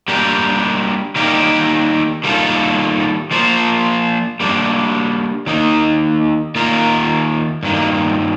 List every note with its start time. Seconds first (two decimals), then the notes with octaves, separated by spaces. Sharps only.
0.08 G3 A#3 D4 G4 A#4
1.16 D#3 G3 A#3 D#4 G4
2.24 D#3 G3 A#3 F4 A4
3.31 F3 A#3 F4 C5
4.40 G3 A#3 D4
5.47 D#3 A#3 D#4
6.55 D#3 A#3 F4 A#4
7.63 G2 D#3 A#3